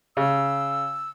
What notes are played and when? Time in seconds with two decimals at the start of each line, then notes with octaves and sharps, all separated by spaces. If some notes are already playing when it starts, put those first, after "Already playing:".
0.17 C#3 E6